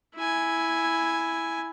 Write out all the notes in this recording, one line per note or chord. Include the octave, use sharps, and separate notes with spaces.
E4 G#5